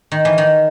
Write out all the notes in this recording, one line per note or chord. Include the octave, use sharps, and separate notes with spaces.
D#3
E3
D#3